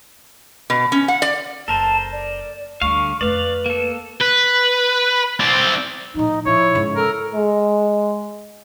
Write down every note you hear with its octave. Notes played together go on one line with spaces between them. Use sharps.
B2
C#4
F#5
D5
F#1 A4 A#4 C5 A5
D5
D2 D3 G3 F5 C#6
F2 A3 B4 D5 F5
A#3 A4
B4
C4 D5
A2 F3 D#4
A2 F3 E4 C#5
G#2 C#3
A4 A#4
G#3